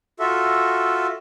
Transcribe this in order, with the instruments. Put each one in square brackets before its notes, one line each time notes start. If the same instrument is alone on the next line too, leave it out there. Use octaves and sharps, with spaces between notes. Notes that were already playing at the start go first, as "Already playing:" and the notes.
[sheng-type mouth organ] F4 F#4 A4 E5